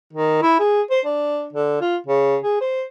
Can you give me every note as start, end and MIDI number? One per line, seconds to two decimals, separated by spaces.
0.13 0.39 51
0.42 0.58 64
0.59 0.82 68
0.90 1.00 72
1.05 1.48 62
1.53 1.79 50
1.81 1.97 65
2.07 2.37 49
2.43 2.56 68
2.61 2.84 72